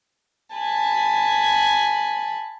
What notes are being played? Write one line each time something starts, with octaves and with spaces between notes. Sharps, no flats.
G#5 A5 B5